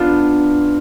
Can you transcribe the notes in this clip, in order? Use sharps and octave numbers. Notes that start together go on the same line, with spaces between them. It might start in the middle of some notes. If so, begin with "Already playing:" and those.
Already playing: B3 D4 F4